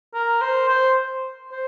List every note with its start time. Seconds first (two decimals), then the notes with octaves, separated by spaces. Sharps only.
0.14 A#4
0.41 C5
0.68 C5
1.51 C5